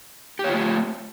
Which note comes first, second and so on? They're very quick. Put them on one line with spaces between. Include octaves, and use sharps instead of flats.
G4 C#5 F4 A3